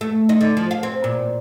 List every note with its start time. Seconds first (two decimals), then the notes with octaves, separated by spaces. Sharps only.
0.01 A3
0.29 D#4
0.41 D3
0.57 F3
0.71 F5
0.83 C4
1.04 A#2